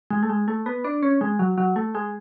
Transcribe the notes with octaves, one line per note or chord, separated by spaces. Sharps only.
G#3
A3
G#3
A3
B3
D4
C#4
G#3
F#3
F#3
A3
G#3